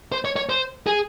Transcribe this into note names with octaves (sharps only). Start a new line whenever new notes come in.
C5
C#5
C#5
C5
G#4